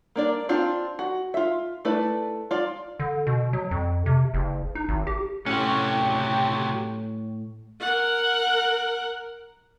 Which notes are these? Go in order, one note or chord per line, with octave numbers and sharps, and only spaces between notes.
A#3 D4 D5
C4 D4 F4
F#4
F4 E5
A3 E4 B4 D5
F4 D5
D3
B2
F#3
F2
C3
F#1
D#4
G#1
G4
A2 C3 F#3 C#4 G4 C#5
A#4 F#5